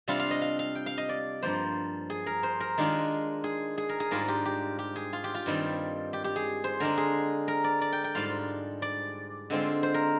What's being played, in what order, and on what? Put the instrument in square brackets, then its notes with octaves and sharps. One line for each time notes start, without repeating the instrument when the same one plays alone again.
[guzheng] C3 G3 D4 F4 F5
F5
D#5
F5
F5
G5
F5
D#5
D5
G2 F3 A#3 C5
G#4
A#4
C5
A#4
D#3 G#3 D4 F4
G#4
G#4
A#4
G#4
G#2 G3 D4 F4 A#4
G4
G4
G4
G#4
F4
G4
F4
G2 D#3 G3 C4
G4
G4
G#4
C5
D3 G#3 D4 A#4
G#4
A#4
D5
D5
G5
G5
G#2 G3 D4 F4 F5
D5
D3 G#3 C4 F4
C5
A#4